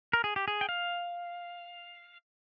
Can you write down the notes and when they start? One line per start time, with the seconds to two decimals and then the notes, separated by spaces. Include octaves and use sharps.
0.13 A#4
0.24 G#4
0.36 G4
0.48 G#4
0.61 G5
0.69 F5